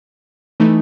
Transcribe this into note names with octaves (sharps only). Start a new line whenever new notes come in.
E3 A3 D#4